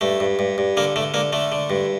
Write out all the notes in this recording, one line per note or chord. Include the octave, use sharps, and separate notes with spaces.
G2 A3
G2
G2
G2
D3 A#3
D3 A3
D3 A#3
D3 A3
D3
G2